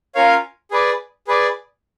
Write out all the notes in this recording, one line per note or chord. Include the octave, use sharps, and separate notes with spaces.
C#4 F4 A#4 C#5 F5
G#4 B4 D5
G#4 B4 D5